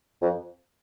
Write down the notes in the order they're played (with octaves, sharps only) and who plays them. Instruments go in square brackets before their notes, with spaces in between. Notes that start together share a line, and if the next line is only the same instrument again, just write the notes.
[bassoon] F2